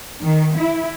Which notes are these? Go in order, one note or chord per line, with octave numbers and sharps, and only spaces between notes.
D#3
E4